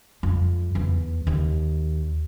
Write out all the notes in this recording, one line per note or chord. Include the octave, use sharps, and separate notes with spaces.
F2
E2
D#2